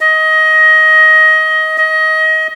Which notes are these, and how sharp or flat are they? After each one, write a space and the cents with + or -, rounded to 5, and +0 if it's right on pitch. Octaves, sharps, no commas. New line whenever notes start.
D#5 +20
D#5 +25